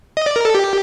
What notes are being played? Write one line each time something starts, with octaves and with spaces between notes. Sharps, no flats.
D#5
D5
A#4
A4
G4